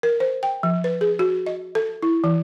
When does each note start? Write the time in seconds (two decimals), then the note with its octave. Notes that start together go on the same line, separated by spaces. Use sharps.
0.03 A#4
0.20 C5
0.43 G5
0.63 F3
0.84 B4
1.01 G#4
1.19 F#4
1.46 D#5
1.75 A4
2.03 E4
2.24 E3